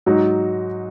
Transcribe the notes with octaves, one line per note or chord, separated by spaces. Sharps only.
G#2 F#3 D#4 F#4